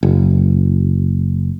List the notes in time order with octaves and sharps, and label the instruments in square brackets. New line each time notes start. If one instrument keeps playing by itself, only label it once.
[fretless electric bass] F#1